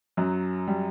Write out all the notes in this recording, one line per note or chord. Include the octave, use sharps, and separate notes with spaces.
F#2 F#3
G3